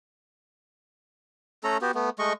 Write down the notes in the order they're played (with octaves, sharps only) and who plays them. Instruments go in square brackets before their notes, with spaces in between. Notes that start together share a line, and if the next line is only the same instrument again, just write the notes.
[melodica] A3 C#4 A4 A#5
B3 F#4 G4
A3 B3
G#3 A3 D#5 C#6